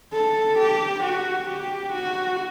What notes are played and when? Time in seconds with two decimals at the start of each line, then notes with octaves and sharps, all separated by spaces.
0.13 A4
0.58 G4
1.03 F#4
1.48 G4
1.93 F#4